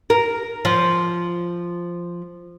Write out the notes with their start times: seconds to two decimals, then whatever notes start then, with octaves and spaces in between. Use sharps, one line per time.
0.10 A#4
0.65 F3